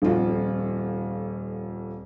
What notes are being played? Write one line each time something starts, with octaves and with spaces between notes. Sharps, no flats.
D#1 F2 F4 F#4